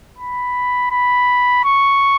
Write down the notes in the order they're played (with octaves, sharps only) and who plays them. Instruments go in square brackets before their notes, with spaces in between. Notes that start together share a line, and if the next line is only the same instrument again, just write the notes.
[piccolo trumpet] B5
B5
C#6